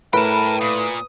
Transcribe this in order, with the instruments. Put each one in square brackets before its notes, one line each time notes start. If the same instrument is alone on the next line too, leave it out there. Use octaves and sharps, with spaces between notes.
[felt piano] A2 [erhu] A#4 [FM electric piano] B4 [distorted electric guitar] G5 A5
[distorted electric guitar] A#2 [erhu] D#6